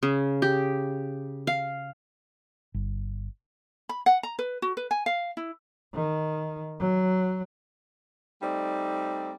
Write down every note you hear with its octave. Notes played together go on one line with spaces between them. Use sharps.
C#3
G4
F5
G1
B5
F#5
A#5
B4
F#4
B4
G#5
F5
E4
D#3
F#3
G3 A3 C4 D#4 D5